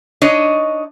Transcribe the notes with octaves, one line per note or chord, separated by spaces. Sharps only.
D4 D#4 C#5 D#5